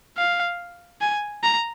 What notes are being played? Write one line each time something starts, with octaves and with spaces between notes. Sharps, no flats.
F5
G#5
A#5